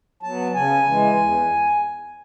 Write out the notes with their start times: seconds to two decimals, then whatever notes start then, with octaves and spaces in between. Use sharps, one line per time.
0.23 F#3 B3 A5
0.54 C#3 G#5
0.86 E3 G#3
1.18 E2